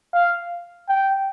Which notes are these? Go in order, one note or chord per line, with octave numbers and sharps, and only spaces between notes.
F5
G5